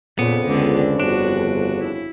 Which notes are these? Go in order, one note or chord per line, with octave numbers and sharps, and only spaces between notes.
F2 A#2 C#3 B3
C#2 D3 C4 D4
G1 D4 F#4
E4